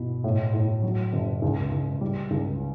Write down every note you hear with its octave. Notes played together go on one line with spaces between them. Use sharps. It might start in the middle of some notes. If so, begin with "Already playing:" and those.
Already playing: B2 E4
A2
A2
F#3
F#1
C#2
C#2
G3
C#2